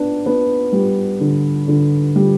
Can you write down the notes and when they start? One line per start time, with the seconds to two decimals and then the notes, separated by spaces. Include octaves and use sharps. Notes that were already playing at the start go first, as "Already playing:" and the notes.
Already playing: B3 D4
0.26 B3
0.73 G3
1.20 D3
1.68 D3
2.16 G3